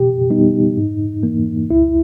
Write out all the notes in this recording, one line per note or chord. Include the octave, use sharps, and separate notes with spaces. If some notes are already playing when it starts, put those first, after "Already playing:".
Already playing: B2 G4
G3 B3 D#4
G#2
E3 A#3
C#2 E4